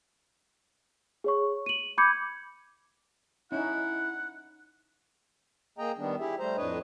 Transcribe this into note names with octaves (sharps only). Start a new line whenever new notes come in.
G#4 C#5 C#6
D#7 F#7
B5 D6 G6 G#6 C#7
C#4 D#4 E4 F#5
A#3 G#4 D#5 G5 A#5
D#3 G3 B3 D4
E4 G4 G#4 E5
G3 A3 C5 A#5
F2 A2 D4 B4 C#5 D#5